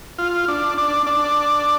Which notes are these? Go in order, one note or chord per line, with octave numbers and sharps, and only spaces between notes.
F4
D4
D4
D4